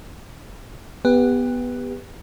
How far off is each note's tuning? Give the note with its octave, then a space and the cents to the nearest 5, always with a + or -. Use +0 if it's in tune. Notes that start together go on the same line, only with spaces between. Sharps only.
B3 +0 G4 +30